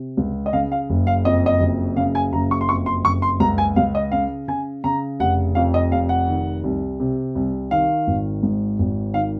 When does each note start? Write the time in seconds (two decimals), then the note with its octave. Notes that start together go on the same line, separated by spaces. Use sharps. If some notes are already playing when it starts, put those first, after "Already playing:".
Already playing: C3
0.17 C#2
0.46 D#5
0.53 C#3 F5
0.72 F5
0.90 F#1
1.07 F5
1.25 F2 D#5
1.46 D#5
1.61 F#1
1.97 C#3 F5
2.15 G#5
2.33 F#1 A#5
2.51 C#6
2.61 C6
2.69 F2 C#6
2.86 C6
3.05 F#1 C#6
3.22 C6
3.40 C#2 A#5
3.58 G#5
3.76 C#2 F5
3.95 D#5
4.12 C#3 F5
4.48 C#3 G#5
4.84 C#3 A#5
5.20 F1 F#5
5.55 F2 F5
5.74 D#5
5.92 F1 F5
6.09 F#5
6.28 D#3
6.64 C2
7.00 C3
7.35 C2
7.71 D#3 F5
8.07 G#1
8.43 G#2
8.79 G#1
9.14 D#3 F5